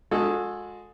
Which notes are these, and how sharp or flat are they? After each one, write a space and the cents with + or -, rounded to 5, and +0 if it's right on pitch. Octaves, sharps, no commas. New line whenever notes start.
G#3 +0 F#4 -35 A4 +5